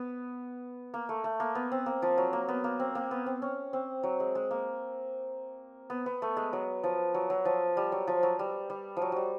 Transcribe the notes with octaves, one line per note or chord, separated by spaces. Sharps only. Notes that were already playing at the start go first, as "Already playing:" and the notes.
Already playing: B3
A#3
A3
A3
A#3
B3
C4
A#3
F3
F#3
A#3
B3
A#3
C4
A#3
B3
C4
C#4
C4
F#3
G#3
G#3
A#3
B3
B3
A3
G#3
F#3
F3
F#3
F#3
F3
G3
F#3
F3
F#3
G3
G3
F3
F#3
F#3 G3